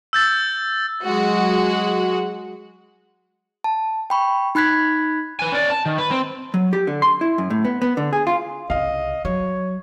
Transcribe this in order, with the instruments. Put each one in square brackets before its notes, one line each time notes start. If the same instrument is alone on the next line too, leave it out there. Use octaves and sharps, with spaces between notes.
[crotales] E6 G6 A6
[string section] F#3 G#3 F#4
[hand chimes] A5
G5 B5 C#6
D#4 B5 F#6 G#6 B6
[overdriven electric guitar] B4 G#5
C#4 D5
A5
D#3
B4
C4
[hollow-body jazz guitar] F#3
G4
D3
C6
E4
F#2
A2
B3
B3
D3
G#4
F4
[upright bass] C2 C#3 [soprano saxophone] D#5 [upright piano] F5
[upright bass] F#3 [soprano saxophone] C#5